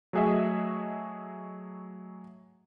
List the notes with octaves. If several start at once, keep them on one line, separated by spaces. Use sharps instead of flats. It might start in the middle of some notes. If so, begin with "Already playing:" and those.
F#3 A3 F#4 G#4 D#5 E5